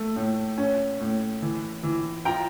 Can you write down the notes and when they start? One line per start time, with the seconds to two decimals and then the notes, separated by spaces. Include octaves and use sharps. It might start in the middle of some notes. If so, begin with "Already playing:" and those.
Already playing: A3
0.16 A2
0.58 C#4
1.00 A2
1.42 E3
1.84 E3
2.25 F4 G5 A#5